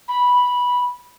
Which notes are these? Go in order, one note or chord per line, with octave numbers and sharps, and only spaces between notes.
B5